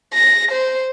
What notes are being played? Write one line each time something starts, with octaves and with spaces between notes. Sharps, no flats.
A#6
C5